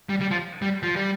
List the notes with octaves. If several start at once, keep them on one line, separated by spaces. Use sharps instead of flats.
G3
G3
F3
G3
F3
G3